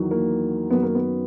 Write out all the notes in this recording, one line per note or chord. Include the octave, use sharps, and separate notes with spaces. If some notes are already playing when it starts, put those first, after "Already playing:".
Already playing: E2 D#3 F#3
A#3
F#2 D#3 F#3 B3
A#3
B3